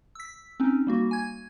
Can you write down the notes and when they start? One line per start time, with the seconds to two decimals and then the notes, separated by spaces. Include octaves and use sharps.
0.15 E6 B6
0.60 C4 C#4 D#4
0.87 G3 A#3 F#4
1.11 G#5 G#6